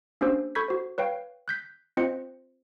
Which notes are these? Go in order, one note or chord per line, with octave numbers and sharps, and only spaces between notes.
A#3 C#4 D4 G4 C5 E6
A4 B5 C#6 G6 G#6 B6
F#4 C5
B4 C#5 F5 G5
F#6 G6 B6
C4 F4 C5 D#5 C#7